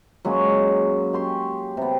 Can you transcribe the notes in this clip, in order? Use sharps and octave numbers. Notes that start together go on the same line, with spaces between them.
F#3 G#3 A#3 C#4
G4 C6 C#6
C3 B3